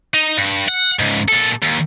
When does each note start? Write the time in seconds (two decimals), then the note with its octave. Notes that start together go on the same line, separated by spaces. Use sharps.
0.14 D#4
0.37 G2
0.68 F#5
0.99 C#2 G#2
1.29 A#2 A4
1.63 D#2